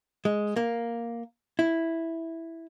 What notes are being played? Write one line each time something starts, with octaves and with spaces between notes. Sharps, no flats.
G#3
A#3
E4